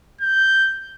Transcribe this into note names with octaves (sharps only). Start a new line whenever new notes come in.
G6